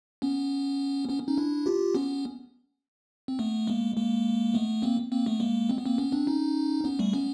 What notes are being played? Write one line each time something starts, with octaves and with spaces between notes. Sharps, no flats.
B3 C#4
B3 C#4
C#4 D#4
D4 E4
F4 G4
B3 C#4
C4
A3 B3
G#3 A#3
G#3 A#3
A3 B3
A#3 C4
A#3 C4
A3 B3
G#3 A#3
C4
B3
A#3 C4
B3 C#4
C4 D4
C#4 D#4
B3 C#4
G3 A3
B3 C#4